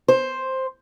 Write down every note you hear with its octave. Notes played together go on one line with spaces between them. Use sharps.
C5